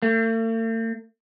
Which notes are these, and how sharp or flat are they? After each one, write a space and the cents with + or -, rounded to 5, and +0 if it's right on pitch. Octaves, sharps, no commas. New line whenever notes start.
A3 +45